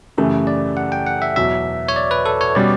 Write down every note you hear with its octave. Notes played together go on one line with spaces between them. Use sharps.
F#2 C#3 E3 A3 G4
D5
F#5
G5
F#5
E5
E2 B2 F#3 E5
C#5
D5
B4
A4
C#5
B2 G3 C#4 D5